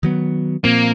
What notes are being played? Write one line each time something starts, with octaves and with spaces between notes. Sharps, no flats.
D#3 F#3 B3
A#2 F3 A#3 C4